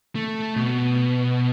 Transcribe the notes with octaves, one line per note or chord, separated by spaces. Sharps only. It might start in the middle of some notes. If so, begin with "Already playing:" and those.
A3
B2